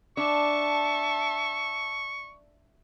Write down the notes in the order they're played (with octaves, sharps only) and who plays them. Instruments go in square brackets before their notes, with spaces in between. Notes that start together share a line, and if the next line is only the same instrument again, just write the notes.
[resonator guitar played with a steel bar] D4 [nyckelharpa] E5 A5 [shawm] C#6